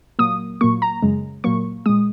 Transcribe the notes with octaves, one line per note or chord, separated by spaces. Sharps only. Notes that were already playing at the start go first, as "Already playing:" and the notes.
A#2 F#3 A#3 D#6
A#2 F#3 A#3 C#6
A#5
F#2 C#3 G#3
A#2 F#3 A#3 C#6
A#2 G#3 D#6